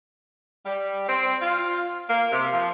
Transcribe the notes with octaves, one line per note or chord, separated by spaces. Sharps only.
G3
C4
F4
A#3
C3
F3